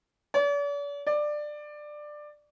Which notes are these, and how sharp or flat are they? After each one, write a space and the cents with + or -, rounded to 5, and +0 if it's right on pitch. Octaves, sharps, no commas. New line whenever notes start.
D5 -45
D5 +15